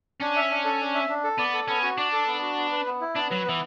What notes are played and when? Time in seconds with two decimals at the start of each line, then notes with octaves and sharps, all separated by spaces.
0.21 C#4 D4
0.36 E5
0.50 D4
0.65 A4
0.80 D4
0.95 E5
1.09 D4
1.24 A4
1.39 B3 D5
1.54 A4
1.68 B3 C#4
1.83 F#4
1.98 D4 D5
2.12 A4
2.27 B3
2.42 F#4
2.57 B3
2.72 B4
2.86 B3
3.01 E4
3.15 B3 D4
3.30 F#3 B4
3.45 E3 B3